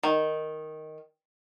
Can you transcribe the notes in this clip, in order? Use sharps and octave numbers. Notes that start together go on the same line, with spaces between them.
D#3